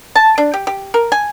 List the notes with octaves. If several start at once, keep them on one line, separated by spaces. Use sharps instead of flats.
A5
D4
G4
G4
A#4
G#5